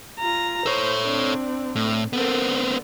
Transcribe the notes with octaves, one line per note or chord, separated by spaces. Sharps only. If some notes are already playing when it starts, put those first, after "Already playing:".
F4 A#5
A4 C5 C#5
C4 D4
A2
B3 C4 A4 A#4
D3